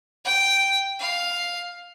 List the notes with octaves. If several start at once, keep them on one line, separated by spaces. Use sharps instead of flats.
G5
F5